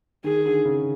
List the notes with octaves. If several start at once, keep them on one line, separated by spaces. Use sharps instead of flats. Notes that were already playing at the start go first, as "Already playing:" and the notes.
D#3 G#4
D3
C#3